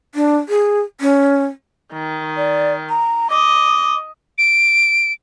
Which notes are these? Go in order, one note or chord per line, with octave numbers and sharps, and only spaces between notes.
D4
G#4
C#4
D#3
D5
A#5
D#5 D6
D7